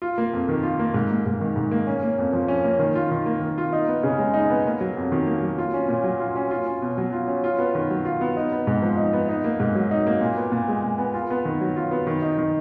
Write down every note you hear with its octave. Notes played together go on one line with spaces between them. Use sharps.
F4
A#3
F2
D#3
F4
A#3
G#2
A#3
G#2
D#3
G#2
A#3
C#4
A#3
F2
F3
C#4
A#3
D#3
F4
D#3
A#3
D#3
F4
D#4
B3
C#3
G#3
D#4
B3
A#3
F#3
F2
D#3
A#3
F#3
F4
C#4
A#2
F#3
F4
C#4
F4
C#4
B2
F#3
F4
C#4
F4
B3
D#3
F#3
F4
B3
D#4
B3
G#2
F3
D#4
B3
D#4
A#3
G#2
F#3
D#4
A#3
A#2
B3
A#2
G#3
A#2
B3
F4
B3
D#3
F#3
F4
B3
D#3
D#4
D#3